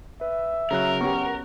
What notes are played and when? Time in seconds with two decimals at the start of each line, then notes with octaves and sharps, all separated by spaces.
0.21 B4 E5
0.71 C#3 F#3 A#4 F#6
1.01 B3 C#4 G4 F#5 C#6